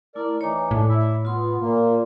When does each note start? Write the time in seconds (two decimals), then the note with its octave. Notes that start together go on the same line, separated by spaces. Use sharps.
0.15 A3 E4 A#4 D5
0.41 E3 D#4 C#5 D6
0.71 A2 D4
0.88 E4 E5
1.25 B3 F4 C6
1.61 A#2 A#3